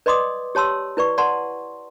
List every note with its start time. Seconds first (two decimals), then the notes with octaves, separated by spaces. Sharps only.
0.06 B4 D5 D#5 C6 D6 D#6
0.55 G4 C#5 A5 C6 E6
0.97 E4 B4 D5 C#6
1.18 D5 F#5 A5 C6